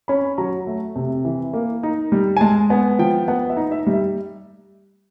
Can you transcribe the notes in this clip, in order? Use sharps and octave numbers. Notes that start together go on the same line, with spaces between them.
C#4 B5
F#3 A#5
A3
C3
E3
A#3
D#4
G3
G#5
G#3 A5
B3 G#5
F3 G5
B3 F#5
E5
D#4
E5
G3
E5